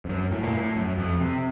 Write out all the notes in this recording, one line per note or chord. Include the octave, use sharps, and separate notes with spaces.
F2
F#2
A2
A#2
A2
F#2
F2
C3